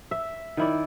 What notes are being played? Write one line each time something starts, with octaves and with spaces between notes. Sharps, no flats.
E5
D#3 E4 D5